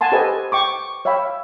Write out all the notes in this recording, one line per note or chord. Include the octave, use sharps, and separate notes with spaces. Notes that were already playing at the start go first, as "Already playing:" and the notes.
F#5 G#5 A5 C6
G4 A4 B4 C5 D#5 G#5
G5 C#6 D6
C#5 E5 F5 G5 B5